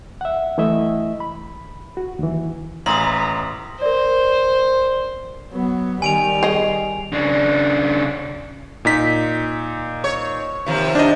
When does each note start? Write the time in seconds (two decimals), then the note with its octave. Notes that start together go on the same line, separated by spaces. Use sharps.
0.21 E5 F#5
0.58 E3 A3 E4 D#5 E5
1.20 B5
1.97 F#4
2.19 D#2 E3
2.86 A1 A#3 E4 G#4 B4 A#5 C6 D#6
3.82 A#4 C5 D5
5.52 F#3 B3
6.02 D#3 G3 G#5 D7 F7
6.43 G#4 D#5
7.13 C#3 D4
8.85 A#2 D#4 B6
10.04 C#5
10.66 D#2 C3 F3
10.95 D4 D#5